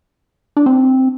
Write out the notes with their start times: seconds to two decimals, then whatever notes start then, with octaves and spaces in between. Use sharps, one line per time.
0.57 D4
0.66 C4